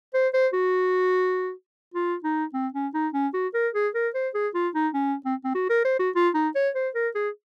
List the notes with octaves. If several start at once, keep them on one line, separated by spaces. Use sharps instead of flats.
C5
C5
F#4
F4
D#4
C4
C#4
D#4
C#4
F#4
A#4
G#4
A#4
C5
G#4
F4
D#4
C#4
C4
C4
F#4
A#4
C5
F#4
F4
D#4
C#5
C5
A#4
G#4